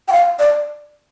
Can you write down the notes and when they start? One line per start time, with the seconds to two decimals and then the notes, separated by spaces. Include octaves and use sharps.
0.08 G5
0.12 F5
0.39 D5